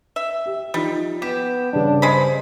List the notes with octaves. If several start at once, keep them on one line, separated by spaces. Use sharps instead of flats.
E5
G4
F3 G3 D#4
B3 G4 E7
G2 C#3 D4
G#3 C5 B5